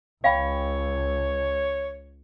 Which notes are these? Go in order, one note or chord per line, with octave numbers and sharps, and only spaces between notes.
C#2 C#5 F5 G5 B5